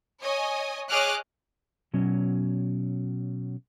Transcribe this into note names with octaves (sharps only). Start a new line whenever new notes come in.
C#5 D#5 G#5
G#4 C#5 D#5 D6 F6 F#6
B2 F#3 C#4